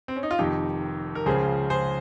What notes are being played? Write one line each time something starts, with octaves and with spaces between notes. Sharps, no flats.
C4
C#4
D#4
F4
F1 F2 D#3 D#4 G4
A#4
C#2 C#3 F3 G#4 C5
G#4 C5